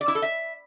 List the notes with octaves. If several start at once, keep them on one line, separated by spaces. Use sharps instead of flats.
D5
E4
A4
E5